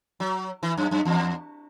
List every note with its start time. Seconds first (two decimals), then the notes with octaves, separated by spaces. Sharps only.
0.20 F#3
0.63 E3
0.77 F#2
0.91 F#2
1.05 E2